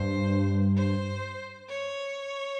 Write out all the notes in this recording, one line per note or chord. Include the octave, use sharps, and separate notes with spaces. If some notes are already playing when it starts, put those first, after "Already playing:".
Already playing: G2 C5
C5
C#5